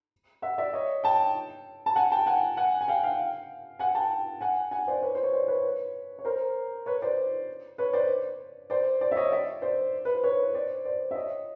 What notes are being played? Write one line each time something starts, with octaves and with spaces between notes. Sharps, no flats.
E5 F#5
D5 E5
C#5 D#5
G5 A5
A5
F#5 G#5
G5 A5
F#5 G#5
F#5 G#5
G#5
F5 G5
F5 G5
F#5 G#5
G5 A5
F#5 G#5
F#5 G#5
C5 D5
B4 C#5
C5
C#5
C5 D5
B4 C#5
C#5
A#4 C5
B4 C#5
C5 D5
B4 C#5
C5 D5
C5 D5
C5 D5
E5
C#5 D#5
D5 E5
C5 D5
B4
C5
B4 C#5
C5 D5
C5 D5
E5
C#5 D#5